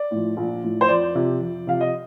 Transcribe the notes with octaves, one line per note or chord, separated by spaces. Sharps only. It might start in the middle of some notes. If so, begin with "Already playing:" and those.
Already playing: D5
A2 F3
A#1
A2 F3
C5
F2 D5
C3 F3
F2
C3 F3 F5
D#5